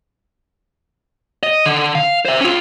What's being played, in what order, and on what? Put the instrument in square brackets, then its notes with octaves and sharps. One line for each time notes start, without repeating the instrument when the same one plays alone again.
[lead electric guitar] D#5
D3
F5
C5 E5
C#4 F4